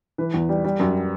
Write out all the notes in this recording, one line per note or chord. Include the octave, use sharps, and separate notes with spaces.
E3 B4
E2
G3
G3
F#2